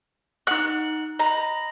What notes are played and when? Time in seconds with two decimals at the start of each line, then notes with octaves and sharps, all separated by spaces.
0.47 D#4 F#5 F#6
1.19 D#5 A#5 B5